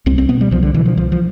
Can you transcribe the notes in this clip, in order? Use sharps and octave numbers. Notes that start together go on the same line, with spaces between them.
C2 C4
C4
B2 B3
G3
C2 F3
D3
B2 E3
F3
C2 F3
F3